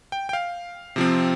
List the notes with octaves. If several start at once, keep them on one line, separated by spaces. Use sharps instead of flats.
G5
G5
F5
C3 F3 C4